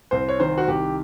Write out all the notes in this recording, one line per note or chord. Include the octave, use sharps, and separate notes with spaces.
C2 C5
C#5
D#3 C5
F#4
C2 G4